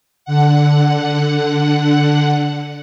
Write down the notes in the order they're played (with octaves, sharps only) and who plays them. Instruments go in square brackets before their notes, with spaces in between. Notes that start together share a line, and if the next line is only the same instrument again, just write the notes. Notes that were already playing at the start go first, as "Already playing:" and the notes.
[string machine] D3 F#5